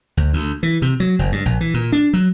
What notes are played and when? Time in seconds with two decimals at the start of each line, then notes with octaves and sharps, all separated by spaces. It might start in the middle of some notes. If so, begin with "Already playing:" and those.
0.17 D2
0.33 D2
0.63 E3
0.82 C3
1.00 F#3
1.19 F#1
1.32 G2
1.46 A#1
1.61 E3
1.74 A#2
1.92 D4
2.13 F#3